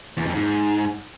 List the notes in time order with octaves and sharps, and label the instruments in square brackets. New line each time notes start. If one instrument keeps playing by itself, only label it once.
[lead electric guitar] E2
F2
G#2